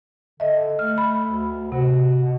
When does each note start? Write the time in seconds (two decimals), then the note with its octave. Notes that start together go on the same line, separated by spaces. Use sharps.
0.40 D3 D#5 E5
0.79 A3 F6
0.98 B5
1.28 D2
1.72 C3 F#4
2.23 B2